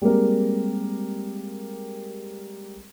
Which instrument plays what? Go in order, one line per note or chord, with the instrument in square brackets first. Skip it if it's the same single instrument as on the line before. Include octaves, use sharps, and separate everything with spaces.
[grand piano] G3 G#3 A#3 C4 G4 A#4